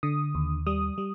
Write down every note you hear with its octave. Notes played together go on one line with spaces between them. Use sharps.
D3 D#6
D#2
G3 D#6
G3